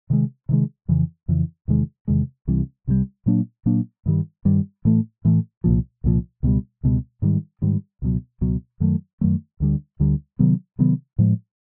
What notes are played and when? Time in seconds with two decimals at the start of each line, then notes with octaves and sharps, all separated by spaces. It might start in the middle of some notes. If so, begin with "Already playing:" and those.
0.10 C3 D#3 G#3
0.49 C3 D#3 G#3
0.88 F2 C#3 E3
1.28 F2 C#3 E3
1.68 E2 C3 D#3 G#3
2.08 E2 C3 D#3 G#3
2.47 C2 C3 E3 G3
2.87 C2 C3 E3 G3
3.26 A#2 F#3 A#3 D4
3.66 A#2 F#3 A#3 D4
4.06 G2 D#3 G3
4.45 G2 D#3 G3
4.85 A2 E3 A3
5.25 A2 E3 A3
5.64 C2 A#2 F3
6.04 C2 A#2 F3
6.43 C#2 B2 G3
6.83 C#2 B2 G3
7.22 G#2 D#3 G3
7.62 G#2 D#3 G3
8.02 C#2 B2 F#3
8.41 C#2 B2 F#3
8.80 F#2 D#3 F#3 A3
9.21 F#2 D#3 F#3 A3
9.60 D2 D3 G3
10.00 D2 D3 G3
10.39 C3 D#3 F#3 B3
10.79 C3 D#3 F#3 B3
11.18 A2 F3 G#3